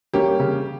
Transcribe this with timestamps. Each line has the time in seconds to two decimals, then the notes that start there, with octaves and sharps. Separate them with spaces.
0.13 G3 A#3 C#4 G4
0.40 C#3